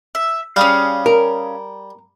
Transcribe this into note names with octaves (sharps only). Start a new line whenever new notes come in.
E5
G3 C#4 G#4 F5
A#4